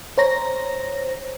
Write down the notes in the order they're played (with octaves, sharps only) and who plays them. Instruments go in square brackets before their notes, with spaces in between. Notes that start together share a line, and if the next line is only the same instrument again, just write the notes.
[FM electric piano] C5 C#5 A#5 A#6